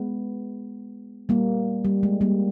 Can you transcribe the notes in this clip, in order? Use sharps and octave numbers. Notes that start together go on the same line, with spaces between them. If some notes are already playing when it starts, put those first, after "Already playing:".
Already playing: G#3 B3
G3 A#3
G3
G#3
G3 A#3